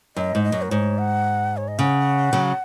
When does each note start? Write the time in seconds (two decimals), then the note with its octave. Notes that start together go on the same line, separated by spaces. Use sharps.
0.16 F#2 D#5
0.35 G#2
0.43 D#5
0.52 F#2
0.62 A#4
0.71 G#2 C#5
0.98 F#5
1.57 C#5
1.68 D#5
1.79 C#3 F#5
2.33 C#3 F#3